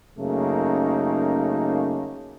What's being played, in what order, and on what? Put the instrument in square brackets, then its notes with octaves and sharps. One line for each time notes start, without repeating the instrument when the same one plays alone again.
[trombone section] F#2 C#3 A3 A#3 D#4